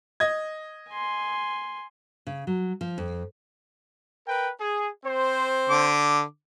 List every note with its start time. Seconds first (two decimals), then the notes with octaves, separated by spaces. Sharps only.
0.20 D#5 G#6
0.90 G#5 C6
2.27 C#3
2.47 F#3
2.81 F3
2.98 F2
4.27 A#4 B4 G5
4.60 G#4
5.04 C4 C5
5.69 D3 D6